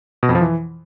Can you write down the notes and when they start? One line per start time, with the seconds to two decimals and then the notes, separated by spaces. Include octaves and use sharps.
0.23 B2
0.29 F2
0.35 F3
0.41 E3